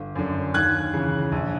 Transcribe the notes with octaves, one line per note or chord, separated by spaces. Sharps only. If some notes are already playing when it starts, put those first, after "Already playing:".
Already playing: G1
F#2 D3
D#2 F#6 G#6
C#3 E3
A#1